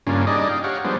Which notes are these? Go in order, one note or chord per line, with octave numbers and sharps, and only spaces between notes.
G2 C#3 A#3 C#4 D4 F4
G3 D4 D#4 G#4 D5 D#5
F5 G5
G4 C#5 F5 F#5
F3 G3 G#3 B3 D4 C5